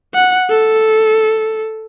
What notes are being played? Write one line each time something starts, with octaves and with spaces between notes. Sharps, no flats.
F#5
A4